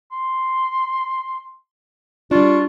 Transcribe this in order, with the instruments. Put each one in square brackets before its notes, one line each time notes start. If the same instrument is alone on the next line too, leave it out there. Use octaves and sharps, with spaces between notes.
[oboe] C6
[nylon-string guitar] G3 D4 [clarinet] F4 [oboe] C#6